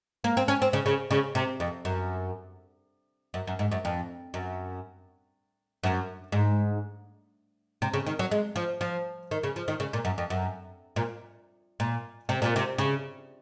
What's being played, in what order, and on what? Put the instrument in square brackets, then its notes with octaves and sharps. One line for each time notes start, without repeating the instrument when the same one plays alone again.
[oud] A#3
C4
C#4
C4
C#3
C#3
C#3
C3
F2
F#2
F#2
F#2
G#2
F#2
F2
F#2
F#2
G#2
C3
C#3
D#3
F#3
G#3
F3
F3
D#3
C#3
F3
D#3
C#3
A#2
F#2
F2
F#2
A#2
A#2
C3
A#2
C3
C#3